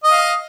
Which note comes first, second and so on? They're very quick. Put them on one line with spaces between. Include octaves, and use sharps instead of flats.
D#5 D#6 F5